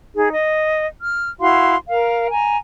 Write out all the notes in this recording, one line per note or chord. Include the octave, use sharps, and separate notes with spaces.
D#4 G#4
D#5
F6
E4 F#4 F5 C6
A#4 F5
G#5 A#5